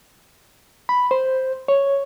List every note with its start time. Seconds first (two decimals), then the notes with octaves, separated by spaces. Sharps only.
0.89 B5
1.11 C5
1.68 C#5